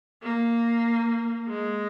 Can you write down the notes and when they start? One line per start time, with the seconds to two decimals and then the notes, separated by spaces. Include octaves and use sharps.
0.23 A#3
1.49 G#3